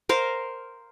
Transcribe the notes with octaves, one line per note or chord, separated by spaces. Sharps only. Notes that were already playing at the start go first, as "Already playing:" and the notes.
A#4 C5 F5